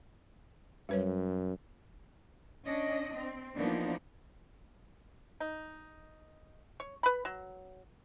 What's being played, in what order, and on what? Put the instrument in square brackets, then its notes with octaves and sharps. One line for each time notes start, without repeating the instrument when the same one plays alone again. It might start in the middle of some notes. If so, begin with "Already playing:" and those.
[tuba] F#2 [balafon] G3 B4 C#5
[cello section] C#4 D4 D#5
C4
E3 F3 A#3 B3 D4 D#4
[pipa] D#4
C#5
B4 B5
F#3